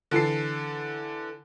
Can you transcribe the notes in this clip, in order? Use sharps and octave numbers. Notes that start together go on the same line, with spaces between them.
D3 E3 A4 C7